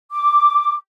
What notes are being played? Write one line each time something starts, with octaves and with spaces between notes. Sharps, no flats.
D6